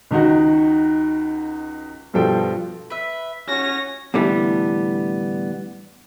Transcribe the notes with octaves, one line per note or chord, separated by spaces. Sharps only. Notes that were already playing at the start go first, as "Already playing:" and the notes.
C#2 D#3 D#4 F#4
G2 B2 F3 A4 G5
B4 E5
C#4 F#4 C#5 A#6
A2 D3 E3 G3 B3